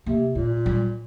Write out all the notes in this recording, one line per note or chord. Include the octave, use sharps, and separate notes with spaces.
C3 A#3
A#2 G#3
G3